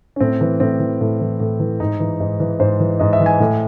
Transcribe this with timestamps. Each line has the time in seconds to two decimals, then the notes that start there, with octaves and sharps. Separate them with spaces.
0.16 C#4
0.20 A2 C4
0.41 E3
0.60 A2 C4
0.80 E3
1.01 A2
1.21 E3
1.40 A2
1.60 E3
1.80 G#2 D#4
2.00 E3
2.20 G#2
2.40 E3
2.59 G#2 C5
2.80 E3
2.99 G#2 D#5
3.13 E5
3.20 E3
3.26 G#5
3.40 A2